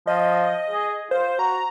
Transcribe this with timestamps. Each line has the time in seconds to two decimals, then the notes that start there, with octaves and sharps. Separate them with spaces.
0.07 F3 D#5
0.71 G#4
1.11 F4 C5
1.39 F#4 A#5